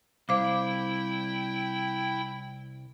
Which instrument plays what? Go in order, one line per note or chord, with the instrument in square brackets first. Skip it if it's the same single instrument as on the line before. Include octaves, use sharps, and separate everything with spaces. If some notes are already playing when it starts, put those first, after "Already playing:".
[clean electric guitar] C2 [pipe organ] E4 G5 [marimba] C5 F5 D6